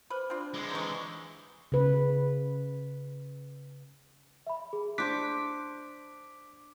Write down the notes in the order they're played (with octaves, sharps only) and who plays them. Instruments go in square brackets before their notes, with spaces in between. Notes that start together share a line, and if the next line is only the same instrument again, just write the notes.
[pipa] B4 [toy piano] C5 D6
[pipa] C4 F4 [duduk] D4
[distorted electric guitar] D3 G#3
[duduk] E3 [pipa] D#4 C#6
[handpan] C#3 B4
[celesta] E5 B5
G#4
[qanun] D4 C5 C#6 [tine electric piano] D6 B6 [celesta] F#6